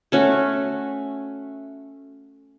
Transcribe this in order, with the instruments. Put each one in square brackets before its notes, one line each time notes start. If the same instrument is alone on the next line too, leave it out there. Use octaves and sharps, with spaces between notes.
[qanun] A3 C#4 F#4